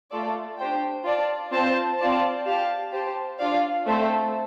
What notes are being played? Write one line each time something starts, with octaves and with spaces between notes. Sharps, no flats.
A3 F4 A4 D5
D4 G4 C5 G5
F4 D5 A5
C4 F4 C5 A5
C4 F4 D5 A5
G4 F5 A5
G4 C5 A5
D4 F4 D5 F5
A3 C4 A4 C5